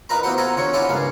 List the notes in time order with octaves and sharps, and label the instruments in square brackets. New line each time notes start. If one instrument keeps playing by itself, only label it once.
[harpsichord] D#4 F4 A#4 B4 A#5 B5
A#3 B3 E4 F#4 C5 F#5
F4 A4 F#5 G#5 A#5
D3 F4 C#5 C#6
C#4 E4 F4 D5 F#5 G#5
C#2 G2 A#3 F5